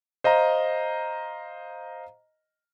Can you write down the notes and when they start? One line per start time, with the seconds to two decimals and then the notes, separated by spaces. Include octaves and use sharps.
0.24 C5 D#5 F5 A#5